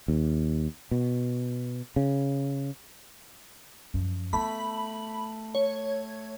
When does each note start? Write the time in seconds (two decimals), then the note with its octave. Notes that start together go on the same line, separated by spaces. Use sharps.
0.08 D#2
0.91 B2
1.96 C#3
3.94 F#2 F3
4.33 A3 B3 F4 B5
5.55 C#5